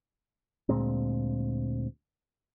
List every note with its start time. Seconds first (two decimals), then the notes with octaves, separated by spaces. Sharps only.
0.69 D2 A#2 G#3 C4